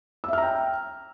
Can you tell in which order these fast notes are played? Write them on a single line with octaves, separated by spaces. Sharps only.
E6 E5 F6 A#5 G5